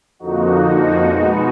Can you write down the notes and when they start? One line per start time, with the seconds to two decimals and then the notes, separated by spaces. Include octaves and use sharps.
0.19 F2 D3 F3 A#3 D#4 F#4
1.08 B2 G#3 B3